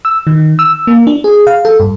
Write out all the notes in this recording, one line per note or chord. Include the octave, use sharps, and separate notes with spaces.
E6
D#3
E6
A#3
D4
G#4
F5
A4
G2